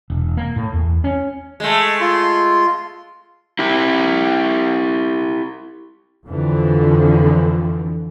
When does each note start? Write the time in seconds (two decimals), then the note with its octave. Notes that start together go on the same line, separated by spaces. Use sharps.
0.10 E1
0.37 A#3
0.56 A2
0.73 E2
1.04 C#4
1.60 G#3 A3
2.01 F4 C6
3.59 E4 G4
6.28 F2 D3 E3 F3